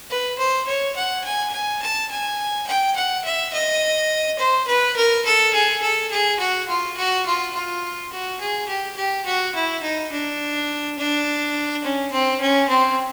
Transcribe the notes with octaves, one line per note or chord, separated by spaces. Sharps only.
B4
C5
C#5
F#5
G#5
G#5
A5
G#5
G5
F#5
E5
D#5
C5
B4
A#4
A4
G#4
A4
G#4
F#4
F4
F#4
F4
F4
F#4
G#4
G4
G4
F#4
E4
D#4
D4
D4
C#4
C4
C#4
C4